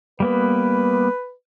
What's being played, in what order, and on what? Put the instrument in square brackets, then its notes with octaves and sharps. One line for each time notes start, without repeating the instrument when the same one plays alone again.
[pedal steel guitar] G3 A#3 B3 [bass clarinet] B4